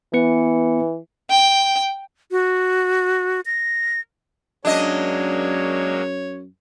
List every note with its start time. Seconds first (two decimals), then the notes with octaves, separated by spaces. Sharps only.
0.14 E3 B3 B4 C#7
1.30 G5
2.31 F#4
3.46 A#6
4.65 F#2 F#3 G#3 A#3 D4 C#5 D#5